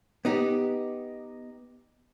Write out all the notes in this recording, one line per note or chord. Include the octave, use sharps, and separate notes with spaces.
B3 D#4 G4